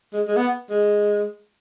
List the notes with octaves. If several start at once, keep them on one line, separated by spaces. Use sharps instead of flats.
G#3
G#3
B3
G#3